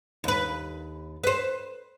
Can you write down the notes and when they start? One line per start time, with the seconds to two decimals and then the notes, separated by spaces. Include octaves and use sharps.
0.24 D#2 B4
1.23 B4 C5